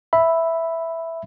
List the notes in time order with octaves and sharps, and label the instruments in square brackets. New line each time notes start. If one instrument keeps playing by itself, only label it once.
[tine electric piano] E5 B5